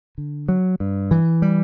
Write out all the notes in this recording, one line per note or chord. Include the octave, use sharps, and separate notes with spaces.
D3
F#3
G2
E3
G3